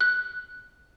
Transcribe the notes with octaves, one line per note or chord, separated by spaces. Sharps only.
F#6